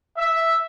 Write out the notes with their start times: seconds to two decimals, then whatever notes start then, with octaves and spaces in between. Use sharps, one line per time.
0.17 E5